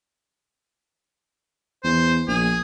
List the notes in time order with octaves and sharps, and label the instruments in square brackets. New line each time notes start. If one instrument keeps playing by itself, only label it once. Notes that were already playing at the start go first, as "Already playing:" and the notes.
[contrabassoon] E2 [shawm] C5
[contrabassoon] A#1 [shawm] G#4